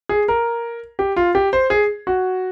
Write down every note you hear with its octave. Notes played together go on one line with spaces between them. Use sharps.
G#4
A#4
G4
F4
G4
C5
G#4
F#4